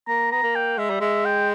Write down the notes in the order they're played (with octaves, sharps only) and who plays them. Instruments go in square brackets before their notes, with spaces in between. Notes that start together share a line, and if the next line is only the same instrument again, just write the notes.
[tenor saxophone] A#3 [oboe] A#5
[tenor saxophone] B3 [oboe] A#5
[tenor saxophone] A#3
[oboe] G5
[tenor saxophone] G#3 [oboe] E5
[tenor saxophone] G3
[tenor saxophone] G#3 [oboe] E5
[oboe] G5